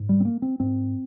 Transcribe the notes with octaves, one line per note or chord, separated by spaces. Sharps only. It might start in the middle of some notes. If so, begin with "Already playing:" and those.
Already playing: G#2
G3
C4
A#3
C4
G#2 C4